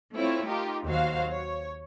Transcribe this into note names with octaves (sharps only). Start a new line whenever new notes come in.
A3 C4 E4 F4 C#5
D#4 F4 G4 A#4
D#2 F#3 F#4 C5 F5
C#5